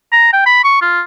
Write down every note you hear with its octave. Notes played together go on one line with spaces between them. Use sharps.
A#5
G5
B5
C#6
F4